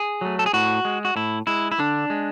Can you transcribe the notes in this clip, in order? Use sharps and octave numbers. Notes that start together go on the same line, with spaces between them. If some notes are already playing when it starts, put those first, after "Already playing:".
Already playing: G#4
F#3 A3
A4
G#4
A2 F#4
G#3
F#4
A2 E4
G#3 E4
E4
D3 D4
G#3